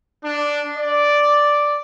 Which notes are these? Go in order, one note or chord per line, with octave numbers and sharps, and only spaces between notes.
D4
D5